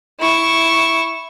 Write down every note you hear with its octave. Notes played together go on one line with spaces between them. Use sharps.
E4 C#6